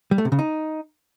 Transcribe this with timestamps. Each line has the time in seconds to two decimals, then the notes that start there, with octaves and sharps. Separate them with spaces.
0.11 G3
0.18 A3
0.25 C3
0.32 C#3
0.39 D#4